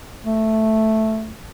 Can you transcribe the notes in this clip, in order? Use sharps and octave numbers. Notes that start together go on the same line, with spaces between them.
A3